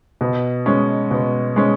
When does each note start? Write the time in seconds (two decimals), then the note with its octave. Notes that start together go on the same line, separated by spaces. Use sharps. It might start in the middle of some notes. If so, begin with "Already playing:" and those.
0.21 B2
0.66 G#3 C#4
1.11 B2
1.56 G#3 C#4